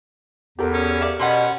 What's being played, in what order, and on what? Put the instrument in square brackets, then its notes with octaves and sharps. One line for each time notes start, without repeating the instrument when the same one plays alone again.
[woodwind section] E2 [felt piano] G4 A4 A#4
[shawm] C#4
[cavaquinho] D5 E5 F5
[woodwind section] B2 [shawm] C#4 [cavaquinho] F#5 B5 C6